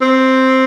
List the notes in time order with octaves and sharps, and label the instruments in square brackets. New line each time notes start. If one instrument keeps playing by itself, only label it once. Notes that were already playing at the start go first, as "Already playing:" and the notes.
[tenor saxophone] C4